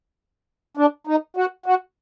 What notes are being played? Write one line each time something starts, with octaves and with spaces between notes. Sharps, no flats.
D4
D#4
F#4
F#4